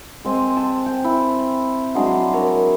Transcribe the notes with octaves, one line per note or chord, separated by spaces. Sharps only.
G#3 C4 G#5
A5
G5
E4
F#3 G#3 D4 G#4
A#4 C#5